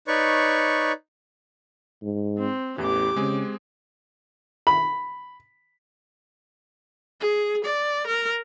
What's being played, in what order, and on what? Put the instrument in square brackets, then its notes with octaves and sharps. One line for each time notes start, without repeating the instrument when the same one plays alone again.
[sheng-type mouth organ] D#4 B4 C#5 D5 C#6
[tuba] G#2
[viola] C4
[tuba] A1 [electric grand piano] E2 E3 [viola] G4 D6
[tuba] C#3 [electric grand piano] G#3 C4 G#4
[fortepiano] B5
[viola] G#4
D5
A#4